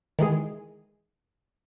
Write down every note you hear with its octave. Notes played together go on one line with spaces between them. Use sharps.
D#3 E3 G#3 G#4